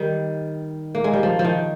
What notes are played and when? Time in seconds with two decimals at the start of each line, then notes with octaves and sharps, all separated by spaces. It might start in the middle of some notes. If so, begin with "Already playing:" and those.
Already playing: D#3 G3
0.95 A#3
1.04 G#3
1.14 G3
1.23 F3
1.39 F3
1.45 D#3